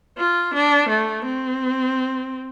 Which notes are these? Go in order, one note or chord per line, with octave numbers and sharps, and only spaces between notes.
F4
D4
A3
C4